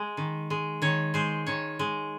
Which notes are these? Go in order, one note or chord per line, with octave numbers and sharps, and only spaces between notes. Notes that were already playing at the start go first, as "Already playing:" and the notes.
Already playing: G#3
D#3
G#3
D#3 C#5
G#3 C5
D#3 C#5
G#3